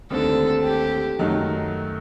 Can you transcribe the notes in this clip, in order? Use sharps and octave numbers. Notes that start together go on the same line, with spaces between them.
D#2 D3 A3 C4 A4
G4
F#2 D#3 F#3 A3 D#4